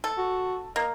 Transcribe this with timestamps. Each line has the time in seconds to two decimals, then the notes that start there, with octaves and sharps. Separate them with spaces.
0.04 A4
0.17 F#4
0.76 A#3 D#5